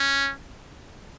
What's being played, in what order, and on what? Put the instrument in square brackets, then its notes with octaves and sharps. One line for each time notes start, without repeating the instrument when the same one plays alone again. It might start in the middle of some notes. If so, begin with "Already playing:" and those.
Already playing: [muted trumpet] C#4